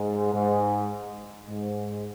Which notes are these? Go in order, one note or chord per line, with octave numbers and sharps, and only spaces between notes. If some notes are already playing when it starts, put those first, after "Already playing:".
Already playing: G#2
G#2
G#2